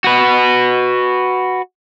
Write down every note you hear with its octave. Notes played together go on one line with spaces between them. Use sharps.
F#4 B4